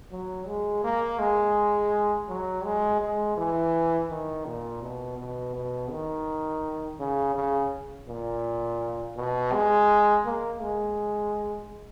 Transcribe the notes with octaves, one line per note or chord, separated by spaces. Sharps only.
F#3
G#3
A#3
G#3
F#3
G#3
G#3
E3
D#3
A#2
B2
B2
B2
D#3
C#3
C#3
A#2
B2
G#3
A#3
G#3